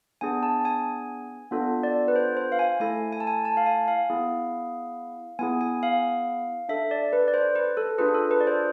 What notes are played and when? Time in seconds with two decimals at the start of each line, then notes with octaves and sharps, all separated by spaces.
0.21 B3 D4 G#4 G#5
0.43 A5
0.65 G#5
1.51 B3 D4 F4 A4
1.83 D5
2.08 B4
2.16 C5
2.37 C5
2.52 F5
2.59 G#5
2.80 A3 E4 A4 G#5
3.13 G#5
3.20 A5
3.27 G#5
3.45 A5
3.57 F5
3.66 G#5
3.88 F5
4.10 B3 E4 G#4
5.39 B3 E4 G#4 G#5
5.61 G#5
5.83 F5
6.69 D4 A4 E5
6.91 D5
7.13 B4
7.28 D5
7.34 C5
7.56 B4
7.77 A4
7.98 D4 F4 G#4 B4
8.14 A4
8.31 B4
8.41 D5
8.47 C5